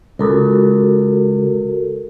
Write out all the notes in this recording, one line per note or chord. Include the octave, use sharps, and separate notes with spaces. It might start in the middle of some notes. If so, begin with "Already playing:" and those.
C#2 F#4 A4 A#4